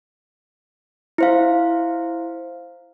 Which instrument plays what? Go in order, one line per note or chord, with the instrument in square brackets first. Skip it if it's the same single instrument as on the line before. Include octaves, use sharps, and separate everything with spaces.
[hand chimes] E4 C5 F5